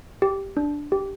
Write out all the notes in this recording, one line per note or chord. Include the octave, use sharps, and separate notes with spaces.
G4
D4
G4